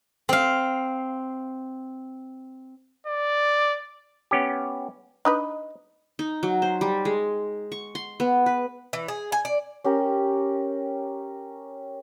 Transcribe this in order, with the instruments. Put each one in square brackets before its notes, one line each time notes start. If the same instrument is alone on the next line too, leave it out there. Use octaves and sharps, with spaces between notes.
[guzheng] C4 F5
[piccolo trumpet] D5
[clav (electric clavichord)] B3 C#4 G4
[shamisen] D4 D#4 B4 [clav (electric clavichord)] D#5
[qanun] D#4
F#3
C5
G3
G#3
C#6
C6
B3
B4
[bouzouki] E3
G#4
G#5
D5
[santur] C#4 G4 A#4